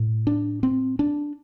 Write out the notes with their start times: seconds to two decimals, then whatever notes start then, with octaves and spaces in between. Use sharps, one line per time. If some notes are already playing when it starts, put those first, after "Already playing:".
Already playing: A2
0.27 D4
0.63 C4
0.99 D4